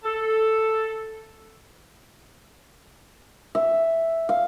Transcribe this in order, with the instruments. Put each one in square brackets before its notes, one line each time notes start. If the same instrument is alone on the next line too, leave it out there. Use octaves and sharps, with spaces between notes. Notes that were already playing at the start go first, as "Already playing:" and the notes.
[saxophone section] A4
[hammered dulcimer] E5
F5